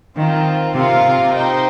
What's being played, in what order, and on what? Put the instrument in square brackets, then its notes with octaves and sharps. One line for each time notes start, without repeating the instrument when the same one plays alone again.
[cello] D#3 [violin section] C4 F4 A#4
[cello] C3 [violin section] F4 A#4 F5
[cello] C3
[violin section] D#4 C5 G5